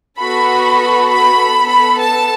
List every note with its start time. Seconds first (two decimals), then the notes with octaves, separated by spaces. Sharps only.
0.18 B3 F#4 A4 B5
1.09 B5
1.38 B3 A4
1.67 B5
1.98 A5